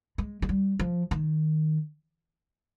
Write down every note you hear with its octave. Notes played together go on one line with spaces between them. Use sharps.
G#3
G#3
G3
F3
D#3